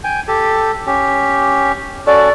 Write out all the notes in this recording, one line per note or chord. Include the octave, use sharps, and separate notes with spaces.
G5 G#5
G4 A4
C#4 G4
C#4 F#4 A4 D5